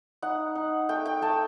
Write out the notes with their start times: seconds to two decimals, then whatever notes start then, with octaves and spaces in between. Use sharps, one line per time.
0.22 D#4 F#5
0.55 D#4
0.89 A3 G5
1.05 G5
1.22 A3 A5